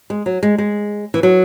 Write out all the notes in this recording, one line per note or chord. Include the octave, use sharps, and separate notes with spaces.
G#3
F#3
G#3
G#3
E3
F#3